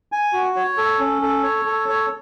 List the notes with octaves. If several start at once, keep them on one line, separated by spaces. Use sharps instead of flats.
G#5
F#4
C#5
A4
C#4
A4
C#5
A4
C#5